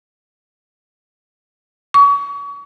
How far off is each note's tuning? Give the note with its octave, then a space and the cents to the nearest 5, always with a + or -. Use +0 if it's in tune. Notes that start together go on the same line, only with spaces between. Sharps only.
C#6 +35